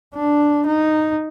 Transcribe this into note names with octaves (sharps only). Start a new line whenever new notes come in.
D4
D#4